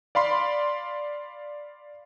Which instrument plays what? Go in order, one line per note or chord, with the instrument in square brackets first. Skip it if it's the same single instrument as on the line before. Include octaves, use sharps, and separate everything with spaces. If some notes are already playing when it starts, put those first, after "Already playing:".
[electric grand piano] D5 F5 B5 C6